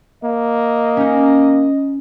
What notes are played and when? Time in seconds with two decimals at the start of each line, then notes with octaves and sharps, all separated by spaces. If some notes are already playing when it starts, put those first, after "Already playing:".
0.24 A#3 D#5
0.97 C#4 D#4